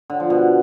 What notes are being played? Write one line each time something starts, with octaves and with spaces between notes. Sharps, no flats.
D3
F3
B2